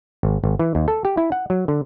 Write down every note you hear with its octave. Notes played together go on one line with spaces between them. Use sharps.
G#1
G#1
E3
D#2
A4
G4
E4
F#5
F#3
D3